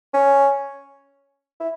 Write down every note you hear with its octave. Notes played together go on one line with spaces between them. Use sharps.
C#4
E4